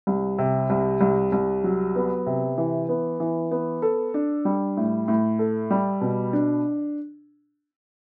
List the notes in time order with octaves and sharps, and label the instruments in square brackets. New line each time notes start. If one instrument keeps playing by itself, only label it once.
[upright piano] C2
C3
C2
C2
C2
F#3
B3
C3
E3
B3
E3
B3
A4
D4
G3
A2
A2
A4
G3
B2
D4